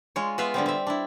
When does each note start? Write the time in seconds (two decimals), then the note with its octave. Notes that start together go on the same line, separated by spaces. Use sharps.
0.16 G#3 F4 C#5
0.38 B3 F4 B4 E5 F5
0.54 D3 G3 B3 C4
0.66 C4 E5
0.87 D4 E4